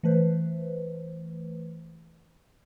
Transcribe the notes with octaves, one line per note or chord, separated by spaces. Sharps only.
E3 A3 B4 C5